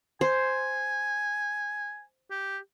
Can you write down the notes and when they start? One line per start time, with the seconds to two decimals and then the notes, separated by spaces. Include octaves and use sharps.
0.21 C5 G#5
2.31 G4